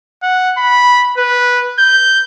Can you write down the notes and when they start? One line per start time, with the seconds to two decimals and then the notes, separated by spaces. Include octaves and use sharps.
0.23 F#5
0.58 B5
1.18 B4
1.79 G6